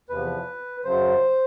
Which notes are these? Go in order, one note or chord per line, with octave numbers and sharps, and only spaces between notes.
E2 C3 F3 B4
F#2 C#3 F#3 C5